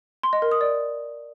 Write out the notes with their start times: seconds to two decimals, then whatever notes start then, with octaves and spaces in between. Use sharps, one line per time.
0.23 C6
0.33 D#5
0.42 A#4
0.51 D#6
0.61 D5